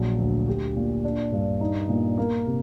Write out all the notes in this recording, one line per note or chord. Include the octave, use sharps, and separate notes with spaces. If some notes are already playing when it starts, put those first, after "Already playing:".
Already playing: A#1 F#3
D2
G4
A#2
D4
G2
D#4
A#2
A#3
C3